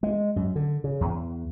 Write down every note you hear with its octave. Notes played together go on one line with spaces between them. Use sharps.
G#3
F#2
D3
C#3
E2